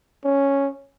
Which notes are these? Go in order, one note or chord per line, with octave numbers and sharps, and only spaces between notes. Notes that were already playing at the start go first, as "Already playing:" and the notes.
C#4